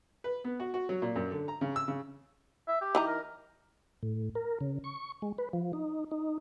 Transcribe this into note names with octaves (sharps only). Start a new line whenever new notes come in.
B4
B3
F#4
F#4
F#3
A#2
F#2
D3
A#5
C#3
E6
C#3
E5
G4
E3 D#4 A#5
A#4
A2
A#4
C#3
C#6
G#3
B4
F3
D#4
D#4